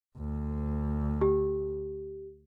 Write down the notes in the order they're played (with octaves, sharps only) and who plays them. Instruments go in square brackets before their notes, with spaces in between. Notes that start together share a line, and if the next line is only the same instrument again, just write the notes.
[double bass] D2
[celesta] G4